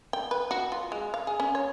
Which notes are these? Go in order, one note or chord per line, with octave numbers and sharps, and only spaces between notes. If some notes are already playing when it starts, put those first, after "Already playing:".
G5
B4
F#4
F4
G#3
F5
G#4
C#4
C#5